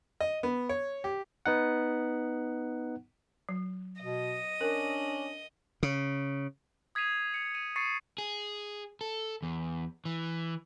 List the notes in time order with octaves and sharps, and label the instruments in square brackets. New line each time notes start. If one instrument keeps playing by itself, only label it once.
[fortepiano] D#5
B3
C#5
G4
[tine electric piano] B3 D#4 F#5
[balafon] F#3
[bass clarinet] B2 [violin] D#5
[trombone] C#4 [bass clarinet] D4 [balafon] A#4
[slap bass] C#3
[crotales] D#6 G#6 B6 C7 D#7 F7
G#6 C#7
D#7
C#6 A6 C7 C#7 D#7
[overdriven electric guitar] G#4
A4
E2
E3